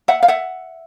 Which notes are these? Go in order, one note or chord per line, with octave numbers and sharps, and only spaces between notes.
E5 F#5
F5
E5 F#5